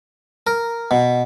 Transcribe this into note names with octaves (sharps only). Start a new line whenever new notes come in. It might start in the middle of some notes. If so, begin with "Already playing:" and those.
A#4
B2